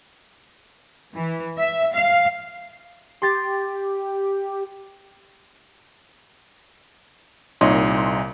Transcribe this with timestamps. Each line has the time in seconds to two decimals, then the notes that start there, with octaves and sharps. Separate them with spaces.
1.15 E3
1.59 E5
1.94 F5
3.22 G4 C6 A6
7.61 C2 A#2 D#4 C#5 D#5 C6